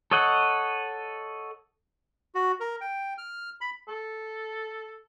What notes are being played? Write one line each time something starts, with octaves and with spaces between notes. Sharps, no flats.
A4 C#5 D#5 F#5
F#4
A#4
G5
F6
B5
A4